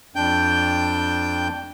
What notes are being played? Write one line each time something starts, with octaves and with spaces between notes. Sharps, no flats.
F2 D4 G5 G6